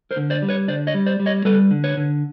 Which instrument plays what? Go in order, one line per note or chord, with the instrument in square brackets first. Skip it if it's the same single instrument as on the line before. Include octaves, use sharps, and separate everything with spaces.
[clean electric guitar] A#4 C5
D3
C5 D5
G3
B4 C#5
D3 C5 D5
C#5 D#5
G3
C5 D5
G3
C#5 D#5
G3 A4 B4
D3
B4 C#5
D3